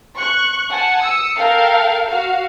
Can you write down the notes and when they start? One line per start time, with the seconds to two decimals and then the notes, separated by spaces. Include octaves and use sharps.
0.16 C#6 F#6
0.71 F#5 G#5 A5
1.03 D#6 E6 C#7
1.37 A4 A#4 F5 G5
2.07 F#4 F5